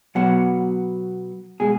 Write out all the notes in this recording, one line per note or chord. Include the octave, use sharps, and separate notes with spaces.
B2 F#3 B3 F#5
B2 G#3 G#4